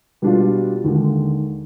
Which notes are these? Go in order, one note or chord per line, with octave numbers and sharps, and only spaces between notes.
B2 G3 D4 F4
D#2 D3 G#3